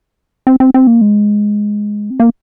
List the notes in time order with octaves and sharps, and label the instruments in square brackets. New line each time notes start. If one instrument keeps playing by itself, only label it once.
[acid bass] C4
C4
C4
A#3
G#3
C4
A#3